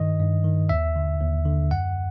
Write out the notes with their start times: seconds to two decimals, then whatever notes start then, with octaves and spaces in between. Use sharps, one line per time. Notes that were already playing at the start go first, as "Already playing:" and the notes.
Already playing: G2 D#3 D#5
0.20 G2
0.44 D#3
0.69 D#2 E5
0.96 D3
1.20 D#2
1.45 D3
1.71 F#2 F#5